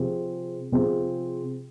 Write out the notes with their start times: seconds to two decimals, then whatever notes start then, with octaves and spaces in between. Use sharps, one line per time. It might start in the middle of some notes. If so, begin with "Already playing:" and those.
Already playing: C3 F3 C4 F4 G#4
0.72 C3 F3 C4 F4 G#4